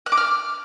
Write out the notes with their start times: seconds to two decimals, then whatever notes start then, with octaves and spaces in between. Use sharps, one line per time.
0.06 F#6
0.12 D6
0.17 F6